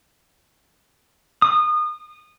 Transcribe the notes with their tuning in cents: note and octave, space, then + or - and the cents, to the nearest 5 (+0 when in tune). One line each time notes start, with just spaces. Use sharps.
D#6 -25